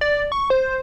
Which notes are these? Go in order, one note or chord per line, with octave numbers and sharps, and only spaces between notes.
D5
C#6
C5